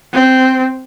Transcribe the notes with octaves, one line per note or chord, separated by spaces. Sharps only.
C4